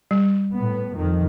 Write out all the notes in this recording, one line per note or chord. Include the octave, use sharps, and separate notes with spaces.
G3
A2 B3
F2 D#3